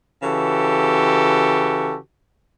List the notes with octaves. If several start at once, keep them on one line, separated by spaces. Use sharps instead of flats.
C#3 E3 F#4 G4 A4